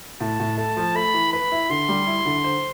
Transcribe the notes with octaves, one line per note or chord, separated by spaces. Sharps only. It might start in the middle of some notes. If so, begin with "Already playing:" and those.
A2 A5
A2
A3 A5
F3
A3 B5
E3
B4 B5
E4
D3 C6
G3
E4
D3
C5